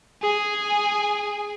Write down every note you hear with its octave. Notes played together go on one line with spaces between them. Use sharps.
G#4 G#5